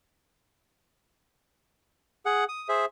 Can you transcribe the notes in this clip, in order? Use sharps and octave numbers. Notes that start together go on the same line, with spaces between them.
G#4 F#5
D#6
G#4 C5 E5